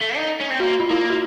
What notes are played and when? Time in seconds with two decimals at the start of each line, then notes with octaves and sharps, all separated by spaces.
0.01 A3
0.16 D#4
0.40 C#4
0.50 C4
0.60 A#3 F#4
0.80 F4
0.90 A#3 E4
1.10 F#4